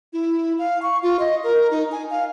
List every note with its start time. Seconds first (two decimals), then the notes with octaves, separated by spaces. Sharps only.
0.13 E4
0.59 F5
0.82 C#6
1.03 F4
1.19 D#5
1.44 A#4
1.71 D#4
1.92 G#5
2.10 F5